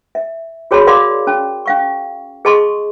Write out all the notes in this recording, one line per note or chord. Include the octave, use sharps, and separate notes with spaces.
E5
F#4 G#4 C#5 A5 B5 C6
A#4 D5 F5 C6 D6
C#4 A5
C#4 F5 C#6
G#4 D#5 A5 C6 C#6